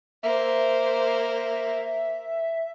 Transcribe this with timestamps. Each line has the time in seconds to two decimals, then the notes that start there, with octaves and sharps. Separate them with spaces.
0.23 A#3 C5 E5